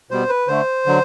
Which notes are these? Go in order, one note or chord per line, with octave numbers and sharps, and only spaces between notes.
B2 G3 B3 C5
B4
D3 A3 C5
D3 F#3